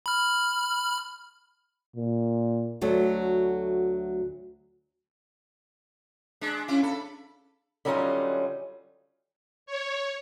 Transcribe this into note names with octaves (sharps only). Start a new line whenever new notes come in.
B5 F6
A#2
D2 F#3 A3
G#3 D4
C#4 E4 F4
A4 B5
D3 F#3 G3 C#4 D#4 F4
C#5